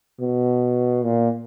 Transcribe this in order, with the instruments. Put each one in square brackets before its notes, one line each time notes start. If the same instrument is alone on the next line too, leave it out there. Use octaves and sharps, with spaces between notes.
[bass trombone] B2
A#2